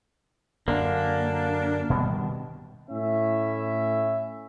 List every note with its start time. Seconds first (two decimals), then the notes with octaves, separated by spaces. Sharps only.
0.68 F#2 D3 A#3 D4
1.90 B2 D#3 G3
2.91 A2 C#4 E4 E5